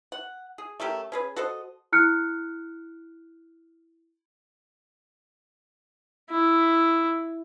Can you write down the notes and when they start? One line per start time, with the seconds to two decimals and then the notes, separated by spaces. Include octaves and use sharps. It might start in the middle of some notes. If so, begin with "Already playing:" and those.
0.12 F#5
0.58 G#4
0.80 A3 C#4 G4 A#4
1.12 C#4 G#4 B4
1.36 F#4 A4 C5 D#5
1.92 E4 F6 F#6 C#7
6.30 E4